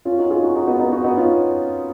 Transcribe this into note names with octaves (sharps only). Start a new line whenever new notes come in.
C#4 F4
D#4 F#4
F4 G#4
D#4 F#4
D#4 F#4
B3 D#4
B3 D#4
D#4 F#4
B3 D#4
C#4 F4